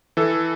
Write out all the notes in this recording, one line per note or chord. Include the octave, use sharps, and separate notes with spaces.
E3 A4